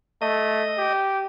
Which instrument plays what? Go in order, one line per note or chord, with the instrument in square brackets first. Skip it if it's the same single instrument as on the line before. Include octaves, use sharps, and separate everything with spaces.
[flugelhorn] A3 [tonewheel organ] D#5
[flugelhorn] G4